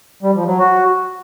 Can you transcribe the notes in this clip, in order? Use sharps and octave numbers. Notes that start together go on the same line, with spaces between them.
G3
F3
F#3
F#4